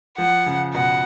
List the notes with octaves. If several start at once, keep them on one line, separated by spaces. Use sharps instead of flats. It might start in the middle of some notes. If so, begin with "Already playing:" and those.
F3 F#5
C#3
B2 F#5